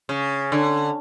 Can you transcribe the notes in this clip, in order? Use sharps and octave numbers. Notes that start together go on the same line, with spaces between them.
C#3
D3